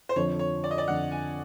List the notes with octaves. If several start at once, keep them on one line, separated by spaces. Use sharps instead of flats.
C5
F2 D3 F3 C#5
C#5
D5
D#5
D5
F2 D3 F3 F#5
G#5